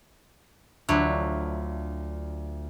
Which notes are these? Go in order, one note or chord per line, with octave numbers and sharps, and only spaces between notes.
D2 F#3 D4 E4 F4